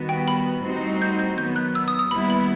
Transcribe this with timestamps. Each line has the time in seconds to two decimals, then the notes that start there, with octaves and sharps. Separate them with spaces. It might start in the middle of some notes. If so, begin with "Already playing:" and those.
Already playing: D#3 G3 B3 F#4
0.09 G5
0.28 B5
0.64 A2 G3 C4 D#4 F#4
1.02 G6
1.19 G6
1.38 D#3 F#3 B3 G6
1.56 F#6
1.75 E6
1.88 D#6
1.99 D#6
2.11 D#2 D#3 G3 B3 E4 B5
2.30 B5